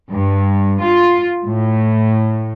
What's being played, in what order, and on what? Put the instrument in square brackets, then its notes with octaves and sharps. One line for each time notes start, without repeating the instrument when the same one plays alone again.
[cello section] G2
F4
A2